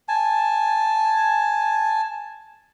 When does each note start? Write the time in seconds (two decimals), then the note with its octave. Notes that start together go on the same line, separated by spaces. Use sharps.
0.08 G#5 A5